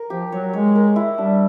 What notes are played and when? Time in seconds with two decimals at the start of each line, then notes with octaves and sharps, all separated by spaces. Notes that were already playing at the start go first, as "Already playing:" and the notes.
Already playing: A#4
0.10 F3 G4
0.32 F#3 C#5
0.53 G#3 C#5
0.75 A#4
0.96 E4
1.18 G3 D4